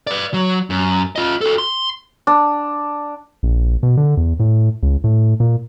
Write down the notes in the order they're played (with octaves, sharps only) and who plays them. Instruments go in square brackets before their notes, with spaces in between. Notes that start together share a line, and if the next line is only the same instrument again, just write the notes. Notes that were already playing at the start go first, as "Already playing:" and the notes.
[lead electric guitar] B4 D5
F#3
F#2
F4 D#5
F#4 A4
C6
[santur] D4
[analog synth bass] A#1
B2
D3
E2
A2
C#2
A2
A#2